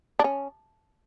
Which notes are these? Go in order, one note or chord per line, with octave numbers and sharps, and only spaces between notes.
D4
C#4